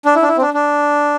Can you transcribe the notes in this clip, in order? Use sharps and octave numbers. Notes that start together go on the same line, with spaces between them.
D4
E4
D4
E4
C4
D4
D4